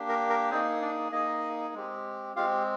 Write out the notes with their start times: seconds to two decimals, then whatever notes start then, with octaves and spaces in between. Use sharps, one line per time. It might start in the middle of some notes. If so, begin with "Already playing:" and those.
Already playing: A#3 D4 G4
0.09 A#4
0.30 A#4
0.51 A#3 C4 D#4 G#4 C5
0.82 D4 D5
1.12 A#3 D#4 G#4 D#5
1.74 G#3 C4 G4
2.36 G#3 C4 F4 G4 F5